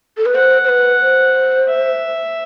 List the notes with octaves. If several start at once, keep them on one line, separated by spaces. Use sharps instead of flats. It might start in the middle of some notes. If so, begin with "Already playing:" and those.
A4
B4
C5 F#5
C5
B4
C5
E5